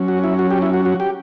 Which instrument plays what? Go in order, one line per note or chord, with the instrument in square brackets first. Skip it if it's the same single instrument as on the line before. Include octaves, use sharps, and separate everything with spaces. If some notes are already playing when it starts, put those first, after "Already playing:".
Already playing: [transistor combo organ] F#3 C#4
F#4
E4
F#4
G4
E4
F#4
F#4
G4